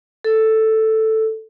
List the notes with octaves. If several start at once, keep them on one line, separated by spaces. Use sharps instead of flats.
A4